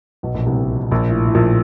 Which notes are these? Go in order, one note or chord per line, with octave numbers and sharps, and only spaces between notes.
B1 B2
A#1 A#2
C2 C3
A#1 A#2
A2
A2
A#1 A#2